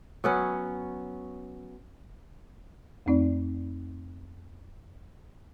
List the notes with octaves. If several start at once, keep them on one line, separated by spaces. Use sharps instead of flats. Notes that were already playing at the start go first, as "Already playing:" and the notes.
F#3 B3 C#4
F2 A3 C4 D#4 D5